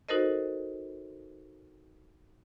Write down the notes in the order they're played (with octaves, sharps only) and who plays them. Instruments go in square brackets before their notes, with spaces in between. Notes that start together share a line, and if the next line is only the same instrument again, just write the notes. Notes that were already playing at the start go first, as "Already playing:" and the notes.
[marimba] D#4 F#4 A4 A#4 C5 D#5